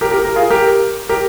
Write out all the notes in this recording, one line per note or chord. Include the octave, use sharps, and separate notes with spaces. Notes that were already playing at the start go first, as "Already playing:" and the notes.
G4 A#4
G4 A#4
A#4
F4 G#4
G4 A#4
G4 A#4